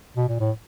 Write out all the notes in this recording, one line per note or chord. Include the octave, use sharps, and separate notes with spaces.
B2
A#2
A2